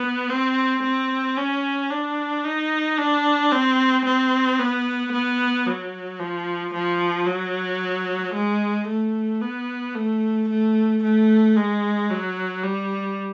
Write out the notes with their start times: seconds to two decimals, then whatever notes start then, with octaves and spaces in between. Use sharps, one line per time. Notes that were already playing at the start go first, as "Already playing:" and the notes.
Already playing: B3
0.30 C4
0.83 C4
1.37 C#4
1.91 D4
2.44 D#4
2.98 D4
3.52 C4
4.06 C4
4.59 B3
5.12 B3
5.67 F#3
6.19 F3
6.74 F3
7.26 F#3
8.34 G#3
8.88 A3
9.42 B3
9.95 A3
10.49 A3
11.03 A3
11.57 G#3
12.10 F#3
12.63 G3